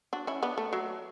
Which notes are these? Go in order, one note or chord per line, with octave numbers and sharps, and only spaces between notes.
D4 F#4
C#4 E4
B3 D4
A3
F#3